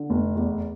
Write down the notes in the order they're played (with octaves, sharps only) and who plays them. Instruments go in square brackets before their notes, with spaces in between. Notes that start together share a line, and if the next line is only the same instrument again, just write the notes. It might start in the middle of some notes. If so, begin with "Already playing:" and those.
Already playing: [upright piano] D3
F1
E2